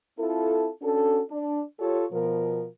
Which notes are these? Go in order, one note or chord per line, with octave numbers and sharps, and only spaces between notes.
C4 E4 F4 A4
C#4 D4 F#4 A4
D4
F4 G4 A4 C#5
B2 F3 A#4